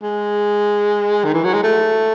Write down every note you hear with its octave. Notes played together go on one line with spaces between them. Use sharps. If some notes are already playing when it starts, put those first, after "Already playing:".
G#3
D#3
E3
F#3
G#3
A3